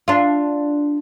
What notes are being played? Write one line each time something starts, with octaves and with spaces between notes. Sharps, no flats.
D4 F4